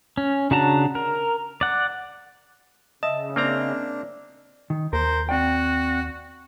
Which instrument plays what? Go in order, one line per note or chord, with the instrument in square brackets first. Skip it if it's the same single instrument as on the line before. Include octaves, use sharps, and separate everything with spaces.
[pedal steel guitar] C#4
C#3 D4 F#4 A5 A#5
A#4
D5 F#5
[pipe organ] C#3 [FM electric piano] D#5 E5 [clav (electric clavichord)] A5
[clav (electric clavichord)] A#3 C4 A#5 [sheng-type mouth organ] D4
[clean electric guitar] D#3
[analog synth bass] D#2 [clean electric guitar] A#4 [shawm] C5
[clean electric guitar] C4 D5 G5 [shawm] F#4